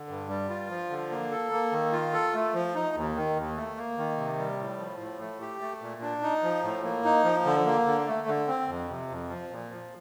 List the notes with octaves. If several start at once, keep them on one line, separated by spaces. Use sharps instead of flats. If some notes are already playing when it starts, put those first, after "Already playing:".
Already playing: D3
G2
G3
F4
F3
D3
A#3
A4
A#3
D#3
F4
A4
A3
F3
D#4
D#2
D#3
D#2
A3
A#3
D#3
C3
G3
A2
F3
A2
A3
G4
A3
A#2
D4
D#4
F3
A2
A#3
D#4
F3
D3
A#3
D3
A3
D3
C4
F2
C3
F2
F3
A#2
F3